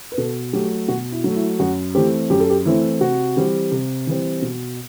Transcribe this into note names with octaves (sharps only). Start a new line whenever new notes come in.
B4
B2 A4
F#3 A3 G4
B2 F#4
E4
F#3 A3
E4
F#2 F#4
E3 A3 C4 G4
F#2 G4
A4
G4
E3 A3 C4 E4
C3 F#4
E3 G3 C4
C3
E3 G3 C4
B2